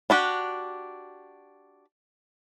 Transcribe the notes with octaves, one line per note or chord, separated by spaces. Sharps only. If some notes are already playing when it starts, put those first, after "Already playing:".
D4 F#4 G4